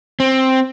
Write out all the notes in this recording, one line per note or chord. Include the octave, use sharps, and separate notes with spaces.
C4